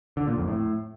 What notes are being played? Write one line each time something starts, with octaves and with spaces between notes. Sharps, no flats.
D3
A#2
F2
A2